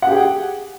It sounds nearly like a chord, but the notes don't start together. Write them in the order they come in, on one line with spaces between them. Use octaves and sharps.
F#5 G4 G#4 G5